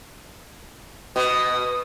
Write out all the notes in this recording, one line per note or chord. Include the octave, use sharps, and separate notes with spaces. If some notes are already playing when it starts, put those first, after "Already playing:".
B2 D#6